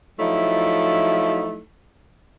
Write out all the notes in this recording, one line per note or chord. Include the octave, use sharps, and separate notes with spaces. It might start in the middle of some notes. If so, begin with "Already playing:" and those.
F3 F#3 A3 D#4 E4